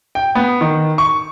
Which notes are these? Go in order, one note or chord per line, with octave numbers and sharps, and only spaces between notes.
G5
B3
D#3
C#6